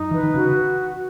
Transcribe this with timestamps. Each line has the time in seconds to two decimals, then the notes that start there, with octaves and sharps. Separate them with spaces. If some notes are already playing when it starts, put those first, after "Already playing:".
Already playing: F#2 D#4
0.11 E3 B4
0.23 D#3
0.34 C#3 F#4